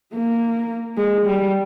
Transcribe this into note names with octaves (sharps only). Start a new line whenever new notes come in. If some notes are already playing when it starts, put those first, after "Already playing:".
A#3
G#3
G3